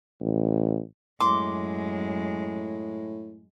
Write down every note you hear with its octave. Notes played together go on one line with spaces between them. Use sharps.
A1
F#2 A2 G#3 C6 D6